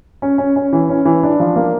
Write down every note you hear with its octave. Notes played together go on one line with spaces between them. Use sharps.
C#4
C#4
C#4
E3
C#4
E3
D4
F3
A#3